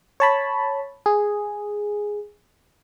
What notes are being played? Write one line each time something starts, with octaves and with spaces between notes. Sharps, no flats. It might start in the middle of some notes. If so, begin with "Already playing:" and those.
C#5 A5 B5
G#4